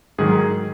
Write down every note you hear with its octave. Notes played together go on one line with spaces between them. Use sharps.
G#2 D#3 F#3 G#4